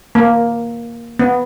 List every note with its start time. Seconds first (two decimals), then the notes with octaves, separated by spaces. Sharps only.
0.15 A#3
1.19 B3